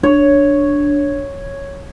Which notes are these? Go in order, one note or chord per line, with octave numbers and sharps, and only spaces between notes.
D4 C#5